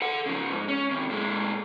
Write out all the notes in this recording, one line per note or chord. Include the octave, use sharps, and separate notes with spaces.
A4 F#5
C#3 F3
G#2
C#4
D#2 C3
A#2 G#3